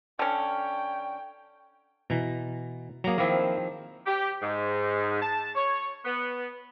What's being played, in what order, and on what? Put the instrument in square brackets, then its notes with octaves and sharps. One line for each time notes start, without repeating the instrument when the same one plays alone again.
[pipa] D3 C#4 [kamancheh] G5
[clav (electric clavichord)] B2 E3 [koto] A#5
[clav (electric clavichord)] F#3 A#3 [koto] G#4 A#5
[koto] D#3 F3 C4 [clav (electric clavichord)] A#3 E4
[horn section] G4
G#2
A5
C#5
B3